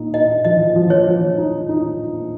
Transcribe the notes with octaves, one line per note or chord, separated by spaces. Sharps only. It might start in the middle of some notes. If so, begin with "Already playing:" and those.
Already playing: A#2 D#4
D#4 D#5
F3 D#5
F3
C#5
F3
D#4
D#4